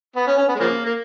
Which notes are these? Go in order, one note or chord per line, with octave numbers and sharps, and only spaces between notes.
B3
C#4
C#4
B3
G#3
C#3 F3 A#3
A#3